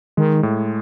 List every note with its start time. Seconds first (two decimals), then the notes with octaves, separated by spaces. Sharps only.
0.17 D#3 G#3
0.43 A2